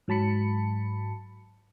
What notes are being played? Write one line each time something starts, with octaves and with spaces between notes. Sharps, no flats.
G#2 F#3 A5 B5 C#7